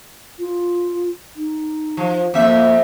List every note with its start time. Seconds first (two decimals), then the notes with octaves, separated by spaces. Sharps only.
0.39 F4
1.36 D#4
1.97 F3
2.34 F2 A#3 E5